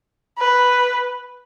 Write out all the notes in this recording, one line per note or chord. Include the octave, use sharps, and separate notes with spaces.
B4